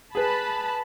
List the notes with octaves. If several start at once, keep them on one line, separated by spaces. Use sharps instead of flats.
G#4 B4 A5 B5